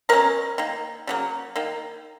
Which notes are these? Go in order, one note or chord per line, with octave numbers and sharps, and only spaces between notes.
B2 F#3 C#4 A#4 A#5
D#3 A#3
C#3 F#3 A#3
D#3 A#3